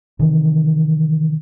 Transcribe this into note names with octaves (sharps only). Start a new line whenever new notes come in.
C3 D#3 E3